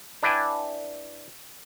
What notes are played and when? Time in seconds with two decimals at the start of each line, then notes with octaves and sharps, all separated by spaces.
0.23 D4 E4 B4 D5 G5 G#5